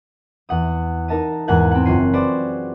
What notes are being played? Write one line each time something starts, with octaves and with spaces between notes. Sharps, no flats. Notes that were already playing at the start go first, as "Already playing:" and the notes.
E2 F#5 D#6
D#4 A#4 D#5 A5 D#7
E2 G#2 A#4 F#5 G#5 F#6
C4 F#5
F#1 F4 C#5 F#6 C7 D#7
F4 F#4 G#4 B4 C5 D5